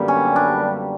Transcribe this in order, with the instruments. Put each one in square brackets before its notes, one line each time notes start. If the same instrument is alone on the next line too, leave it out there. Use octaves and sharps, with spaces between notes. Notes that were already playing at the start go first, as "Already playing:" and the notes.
Already playing: [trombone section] F#2 D3 G3 B3 [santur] A#3
[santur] C#4
D4